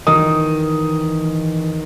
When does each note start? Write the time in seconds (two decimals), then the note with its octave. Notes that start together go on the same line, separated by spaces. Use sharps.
0.07 D#3 E3 D#6